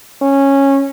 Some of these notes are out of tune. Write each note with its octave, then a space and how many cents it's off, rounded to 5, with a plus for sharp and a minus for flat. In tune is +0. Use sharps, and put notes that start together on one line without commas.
C#4 -10